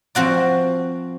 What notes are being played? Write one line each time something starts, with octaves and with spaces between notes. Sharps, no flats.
F3 C4 F#4 D5